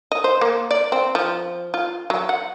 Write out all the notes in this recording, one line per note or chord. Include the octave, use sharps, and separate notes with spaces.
D#5
C5
A#3
D5
C4
F3
F4
F#3
F#5